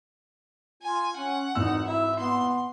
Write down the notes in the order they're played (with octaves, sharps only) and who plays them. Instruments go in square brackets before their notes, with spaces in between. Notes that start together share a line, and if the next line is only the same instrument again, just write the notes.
[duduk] F4 [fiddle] G#5
[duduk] C#4 [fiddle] F#5
[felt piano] G#1 E3 E6 [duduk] D#4
[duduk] E4 [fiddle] E5
[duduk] B3 [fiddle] C6